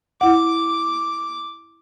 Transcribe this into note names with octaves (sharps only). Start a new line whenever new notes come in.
E4 F#5 D6